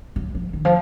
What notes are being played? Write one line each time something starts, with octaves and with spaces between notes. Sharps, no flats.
F#3
F3
D#3
F3